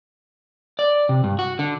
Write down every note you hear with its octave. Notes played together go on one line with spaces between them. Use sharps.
D5
C3
G2
F#4
D3